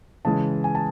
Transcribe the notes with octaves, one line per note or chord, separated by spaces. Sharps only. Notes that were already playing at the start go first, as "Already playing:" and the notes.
C#3 E3 G#3 A5
G#5
A5